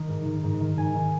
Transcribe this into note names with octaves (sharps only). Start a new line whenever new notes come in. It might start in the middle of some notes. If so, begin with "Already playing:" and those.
Already playing: D#3 D#5
G#2
D#3
G#2
D#3
G#2 G#5
D#3